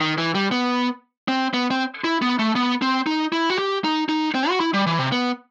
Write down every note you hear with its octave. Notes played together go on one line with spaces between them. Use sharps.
D#3
E3
G3
B3
C4
B3
C4
E4
B3
A3
B3
C4
D#4
E4
F#4
G4
D#4
D#4
C4
F#4
E4
G3
E3
C3
B3